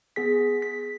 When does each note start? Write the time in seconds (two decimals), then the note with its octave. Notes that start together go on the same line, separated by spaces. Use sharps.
0.16 B3 G#4 B6
0.62 B6